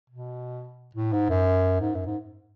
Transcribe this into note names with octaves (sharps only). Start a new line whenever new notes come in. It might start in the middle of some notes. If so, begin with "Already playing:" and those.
B2
A2
G#2
F#2
G#2
F#2
G#2